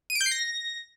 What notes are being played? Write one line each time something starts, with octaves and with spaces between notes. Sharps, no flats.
D#7
D7
G6
C7
A#6